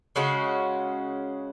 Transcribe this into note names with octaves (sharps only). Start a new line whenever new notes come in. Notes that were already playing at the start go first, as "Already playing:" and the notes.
C#3 G#3 C#4 F#4